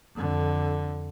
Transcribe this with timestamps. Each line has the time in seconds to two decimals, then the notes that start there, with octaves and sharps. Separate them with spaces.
0.15 F2 D3